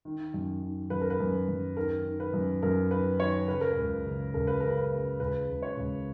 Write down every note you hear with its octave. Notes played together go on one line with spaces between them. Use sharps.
D#3
F#2
D#3
F#2 B4
A#4
B4
F#2
F#2
D#3 A#4
D#3
B4
F#2
F#2 A#4
D#3 B4
D#3 C#5
C#3 B4
A#4
C#2 B4
C#3
C#2 A#4
B4
C#3 A#4
B4
C#3
C#2 B4
C#2
C#5
C#2